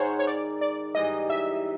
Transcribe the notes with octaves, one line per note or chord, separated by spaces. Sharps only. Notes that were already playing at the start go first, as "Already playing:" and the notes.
Already playing: G#2 D#3 G#3 C5 C#5 F#5
C#5
D5
D5
G#2 E3 G3 D#5
E5